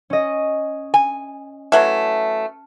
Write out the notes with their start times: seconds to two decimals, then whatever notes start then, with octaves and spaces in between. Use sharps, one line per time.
0.10 C#4 D#5
0.94 G#5
1.72 E3 F#3 A3 A5 F6